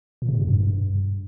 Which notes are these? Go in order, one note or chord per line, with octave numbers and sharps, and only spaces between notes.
A#2
C3
G#2
F#2
G2